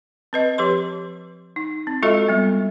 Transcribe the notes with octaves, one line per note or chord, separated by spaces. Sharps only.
C4 B4 D#5
F3 G4 B4 C6
D#4
C4
G#3 F4 F#4 A4 D#5 E5
G3 B3